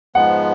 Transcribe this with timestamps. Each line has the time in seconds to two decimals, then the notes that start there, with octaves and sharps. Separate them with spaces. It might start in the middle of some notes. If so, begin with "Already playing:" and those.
0.15 G#2 F3 G#3 B3 F#5